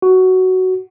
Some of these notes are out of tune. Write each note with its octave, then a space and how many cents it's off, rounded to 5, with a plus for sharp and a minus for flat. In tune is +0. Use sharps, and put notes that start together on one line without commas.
F#4 +10